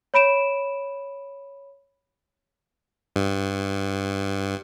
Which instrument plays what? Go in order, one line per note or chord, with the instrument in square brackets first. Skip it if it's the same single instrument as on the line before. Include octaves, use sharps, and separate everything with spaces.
[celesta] C#5 B5 D7 E7
[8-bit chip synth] G2